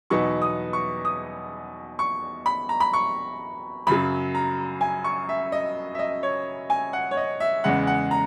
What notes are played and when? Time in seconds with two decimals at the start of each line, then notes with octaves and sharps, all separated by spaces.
0.10 E2 B2 F#3 B3 D#4 C#6
0.42 D#6
0.73 C#6
1.05 D#6
1.99 C#6
2.46 B5
2.69 A#5
2.80 B5
2.93 C#6
3.87 F#2 C#3 F#3 B5
4.35 A#5
4.81 G#5
5.04 C#6
5.29 E5
5.52 D#5
5.95 E5
5.99 D#5
6.23 C#5
6.70 G#5
6.93 F#5
7.11 C#5
7.17 D#5
7.40 E5
7.64 E2 C#3 G#3 F#5
7.87 F#5
8.11 A#5